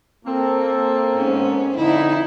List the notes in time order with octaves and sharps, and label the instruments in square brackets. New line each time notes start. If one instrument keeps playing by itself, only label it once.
[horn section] A#3 C4 A4
[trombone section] G#2 [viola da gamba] B3 C#4
[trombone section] F2 D3 D#4 [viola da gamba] E4